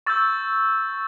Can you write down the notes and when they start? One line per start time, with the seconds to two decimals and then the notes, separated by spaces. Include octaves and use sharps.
0.06 C#6 E6 G6 A6